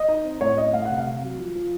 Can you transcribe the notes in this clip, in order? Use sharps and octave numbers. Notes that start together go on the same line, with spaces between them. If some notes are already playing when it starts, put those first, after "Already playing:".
Already playing: D#5
D#4
C4
A2 C#5
C#4 D#5
A3 F5
C3 F#5
F5
C3
F#3
F3
F3